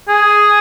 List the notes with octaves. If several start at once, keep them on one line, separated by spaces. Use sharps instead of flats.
G#4